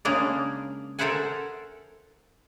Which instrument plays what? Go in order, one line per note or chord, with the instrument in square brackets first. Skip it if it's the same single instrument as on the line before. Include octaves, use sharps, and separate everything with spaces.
[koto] C#3 G#3 A#3 D4 G#4 A#4
A4 A#4 C5 E5 F#5 G#5